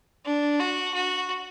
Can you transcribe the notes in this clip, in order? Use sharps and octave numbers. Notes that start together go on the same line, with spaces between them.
D4
F#4
F#4